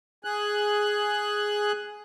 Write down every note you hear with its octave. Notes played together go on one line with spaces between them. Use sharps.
G#4 F#6